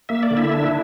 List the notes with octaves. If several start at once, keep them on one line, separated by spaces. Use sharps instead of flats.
A#3 E5
D5
D3
E4 E5
D4